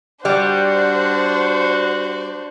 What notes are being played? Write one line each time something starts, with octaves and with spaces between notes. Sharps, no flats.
G3 D4 F#4 C5 D5 F#5